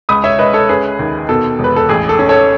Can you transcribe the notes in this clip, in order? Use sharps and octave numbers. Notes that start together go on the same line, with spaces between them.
C#2 B5 D#6
C#5 E5
C#2 B4 D#5
A4 C#5
C#4 G#4 B4
D#2
B2 A4
E1
B4
A4
A1 G#4
A4
C#4
A4 C#5